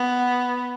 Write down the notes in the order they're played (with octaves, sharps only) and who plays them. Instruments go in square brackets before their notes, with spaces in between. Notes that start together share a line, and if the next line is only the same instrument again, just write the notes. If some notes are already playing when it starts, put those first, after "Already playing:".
Already playing: [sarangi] B3